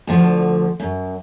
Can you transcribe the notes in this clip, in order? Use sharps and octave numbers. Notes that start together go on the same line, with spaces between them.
D2 D3 F3
F#2